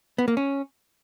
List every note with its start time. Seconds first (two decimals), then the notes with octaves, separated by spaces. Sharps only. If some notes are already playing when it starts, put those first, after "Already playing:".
0.18 B3
0.28 A#3
0.37 C#4